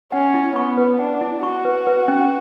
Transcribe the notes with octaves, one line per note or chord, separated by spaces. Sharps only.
C#4 F#5
E4
B3 C#6
B4
D4 F#5
E4
F#4 C#6
B4
B4
C#4